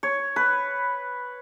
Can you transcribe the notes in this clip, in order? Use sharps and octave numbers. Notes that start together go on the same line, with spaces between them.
C#5
B4